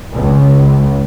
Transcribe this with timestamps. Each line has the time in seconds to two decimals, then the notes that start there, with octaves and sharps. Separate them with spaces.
0.13 C#2